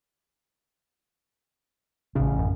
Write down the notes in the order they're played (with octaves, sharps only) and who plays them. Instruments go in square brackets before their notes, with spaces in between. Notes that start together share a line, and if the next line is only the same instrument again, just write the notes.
[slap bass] A1 C#4 [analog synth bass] C#3
[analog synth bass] F#2